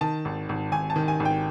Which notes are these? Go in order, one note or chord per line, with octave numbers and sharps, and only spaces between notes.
D#3 A5
G#1
G#1
G#1 G#5
A5
D#3
G#5
G#1
G5